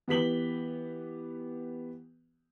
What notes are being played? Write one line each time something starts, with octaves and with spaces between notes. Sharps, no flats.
E3 B3 G4 B6 F#7 G7